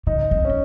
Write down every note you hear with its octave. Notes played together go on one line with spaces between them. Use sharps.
C#3 D#4
C4
C#4